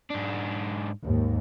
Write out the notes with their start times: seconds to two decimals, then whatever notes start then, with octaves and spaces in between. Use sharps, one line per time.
0.10 G#2 D4
1.04 D#2 G#2